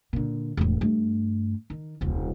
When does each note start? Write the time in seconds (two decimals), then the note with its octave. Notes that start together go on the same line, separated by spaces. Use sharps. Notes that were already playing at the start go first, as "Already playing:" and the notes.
0.13 A#2 D3
0.57 E1 A2
0.81 G2 A3
1.70 D#3
2.01 D#1 C2